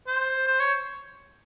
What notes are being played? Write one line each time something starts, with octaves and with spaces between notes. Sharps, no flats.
C5
C5
C#5